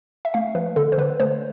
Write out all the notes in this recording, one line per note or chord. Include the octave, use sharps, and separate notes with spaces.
E5
A3 F5
F3 B4
D3 A4
C5
D3 B4
A3 C5